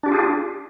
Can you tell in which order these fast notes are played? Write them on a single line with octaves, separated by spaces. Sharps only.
D4 G4 F4 G#4